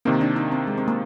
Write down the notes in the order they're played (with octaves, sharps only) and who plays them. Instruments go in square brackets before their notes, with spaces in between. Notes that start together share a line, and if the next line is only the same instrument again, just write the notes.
[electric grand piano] C3 D#3 A#3 [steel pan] C4
[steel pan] D4
D#4
C4
G#3
C4
A#3